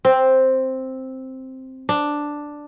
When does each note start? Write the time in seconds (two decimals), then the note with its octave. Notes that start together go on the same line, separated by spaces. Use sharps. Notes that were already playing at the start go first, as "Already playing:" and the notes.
0.05 C4
1.89 D4